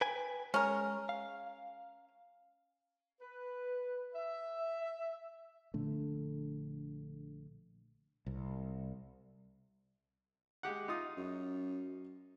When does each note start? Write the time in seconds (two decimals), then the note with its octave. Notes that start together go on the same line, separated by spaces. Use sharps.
0.01 B4 G5 G#5
0.54 G#3 C#4 A#4
1.09 F5
3.21 B4
4.14 E5
5.74 A#1 A#2 D3 A3
8.26 C2
10.63 G#3 G4 F#5
10.88 D#4 F4 D#6
11.17 F#2